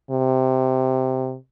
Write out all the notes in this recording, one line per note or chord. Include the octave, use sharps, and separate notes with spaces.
C3